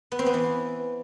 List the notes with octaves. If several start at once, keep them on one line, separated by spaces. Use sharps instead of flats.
B3
C4
B3
E3